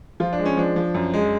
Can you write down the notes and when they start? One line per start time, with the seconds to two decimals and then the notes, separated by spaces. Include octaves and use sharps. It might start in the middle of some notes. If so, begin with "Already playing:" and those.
0.20 F3 F4
0.33 D4
0.39 G#3
0.45 C#4
0.57 F3 D4
0.76 F3
0.94 F#2
1.14 G#3